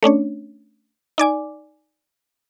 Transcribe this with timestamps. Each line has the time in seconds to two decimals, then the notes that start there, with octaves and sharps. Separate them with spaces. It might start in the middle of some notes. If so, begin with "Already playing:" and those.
0.03 A3 C#4 D4 C#5
1.18 D#4 D5 G#5 D6